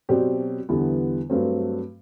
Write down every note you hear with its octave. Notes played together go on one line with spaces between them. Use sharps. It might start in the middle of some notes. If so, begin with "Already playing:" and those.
B2 F#3 C4 G4 D5
E2 D3 G3 B3 E4
G2 F#3 A3 C4